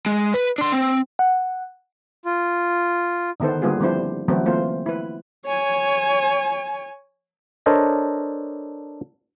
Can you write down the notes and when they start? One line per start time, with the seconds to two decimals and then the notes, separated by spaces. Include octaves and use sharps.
0.06 G#3
0.34 B4
0.58 D4 C6
0.72 C4
1.19 F#5
2.25 F4
3.40 D3 D#3 B3 A4 C5
3.62 D3 G3 A#3 B3 F4 G#4
3.80 F3 G3 C4 D4 E4 C5
4.28 D3 E3 F#3 A3 B3 C4
4.45 E3 A3 A#3 C4 F4 C5
4.86 E4 B4
5.46 C#5 G#5
7.66 D4 A4 A#4 C5 C#5 D#5